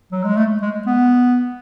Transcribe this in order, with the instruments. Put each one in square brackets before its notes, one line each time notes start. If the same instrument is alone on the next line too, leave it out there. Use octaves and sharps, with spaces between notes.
[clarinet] F#3
G#3
A3
G#3
B3